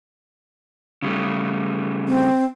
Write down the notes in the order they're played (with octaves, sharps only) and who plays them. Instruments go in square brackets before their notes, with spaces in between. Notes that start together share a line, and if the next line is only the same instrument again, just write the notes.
[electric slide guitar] C#3 G3 A3
[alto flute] C4